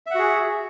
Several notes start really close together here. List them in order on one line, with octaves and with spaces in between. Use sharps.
E5 F#5 F#4 G#4